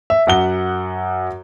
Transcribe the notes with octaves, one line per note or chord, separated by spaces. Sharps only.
E5
F#2 F#5 G7